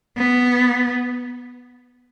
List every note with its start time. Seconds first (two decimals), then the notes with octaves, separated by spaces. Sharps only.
0.17 B3